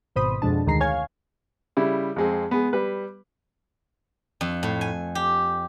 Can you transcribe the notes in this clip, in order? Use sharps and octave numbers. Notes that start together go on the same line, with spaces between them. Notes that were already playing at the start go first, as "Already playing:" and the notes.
G#1 B2 C5 B5 D#6
F2 B2 G#3 D4 A5
D2 D#3 G#3 A#5 C7
C#5 F5 G#5 G#6
C#3 G3 E4
F2 G#3 C4
G#3 B3
G3 B4
F2
A2
G#5
G4